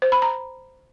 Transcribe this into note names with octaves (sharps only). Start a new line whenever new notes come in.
C5
B5
A#5